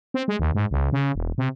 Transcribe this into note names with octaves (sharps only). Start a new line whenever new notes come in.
C4
G#3
D#2
G#2
C#2
C#3
E1
C3